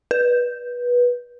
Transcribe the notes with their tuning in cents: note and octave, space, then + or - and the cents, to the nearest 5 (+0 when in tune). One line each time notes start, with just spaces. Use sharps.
B4 -20